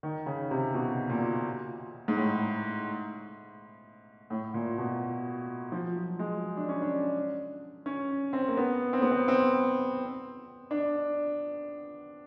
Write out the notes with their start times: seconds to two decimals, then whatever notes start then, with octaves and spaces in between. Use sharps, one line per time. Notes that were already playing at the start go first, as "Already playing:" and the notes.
0.03 D#3
0.26 C#3
0.51 C3
0.74 B2
1.10 A#2
2.08 G#2
2.17 A2
4.30 A2
4.54 A#2
4.78 B2
5.72 F3
5.96 F#3
6.19 G#3
6.57 D4
6.69 C#4
6.82 D4
7.86 C#4
8.33 C4
8.48 A#3
8.57 B3
8.93 C4
9.02 B3
9.11 C4
9.28 C4
10.71 D4